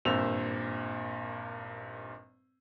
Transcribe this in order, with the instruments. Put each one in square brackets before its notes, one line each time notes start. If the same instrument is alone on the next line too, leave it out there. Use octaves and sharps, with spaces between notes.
[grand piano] G#1 G2 A#2 C5 E6 F7